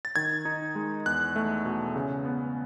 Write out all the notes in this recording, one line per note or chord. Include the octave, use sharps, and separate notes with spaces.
A6
D#3 G#6
D#4
G#3
E2 F#6
A3
B2
C#3
B3